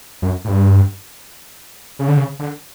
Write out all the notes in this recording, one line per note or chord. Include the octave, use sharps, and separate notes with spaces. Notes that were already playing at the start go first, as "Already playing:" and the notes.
F#2
A2
G2
C#3
D3
C#3
D3